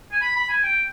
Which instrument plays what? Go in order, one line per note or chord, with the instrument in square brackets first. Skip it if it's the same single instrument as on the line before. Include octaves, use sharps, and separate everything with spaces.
[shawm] G#5
B5
B5
G#5
G5